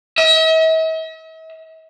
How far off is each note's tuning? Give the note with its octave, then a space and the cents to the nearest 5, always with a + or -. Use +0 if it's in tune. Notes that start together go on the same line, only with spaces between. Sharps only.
E5 -45